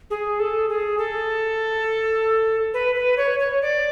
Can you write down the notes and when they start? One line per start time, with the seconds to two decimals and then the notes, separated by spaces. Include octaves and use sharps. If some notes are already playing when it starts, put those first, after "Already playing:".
0.10 G#4
0.40 A4
0.69 G#4
0.98 A4
2.74 B4
2.95 B4
3.17 C#5
3.39 C#5
3.62 D5